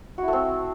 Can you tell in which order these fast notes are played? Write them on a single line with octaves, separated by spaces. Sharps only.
F#4 E4 A3 C4